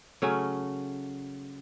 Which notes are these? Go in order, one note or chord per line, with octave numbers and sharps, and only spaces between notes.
C#3 F#3 A3 C#4